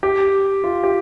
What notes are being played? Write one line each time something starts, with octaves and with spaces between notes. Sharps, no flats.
G4
F4
G4